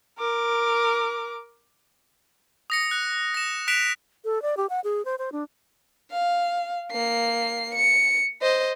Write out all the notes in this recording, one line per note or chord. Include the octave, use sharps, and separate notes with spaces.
A#4 D6
D#6 A#6 C#7
F#6
A#6 E7
F#6 B6 D7 E7 F7
A4
D5
G4
F#5
G#4
C5
C5
D4
F5
A#3 C7
C#7
C5 D#5